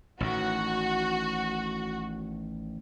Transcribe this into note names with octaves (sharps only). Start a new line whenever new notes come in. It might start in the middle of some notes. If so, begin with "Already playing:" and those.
A1 A2 D#3 F#4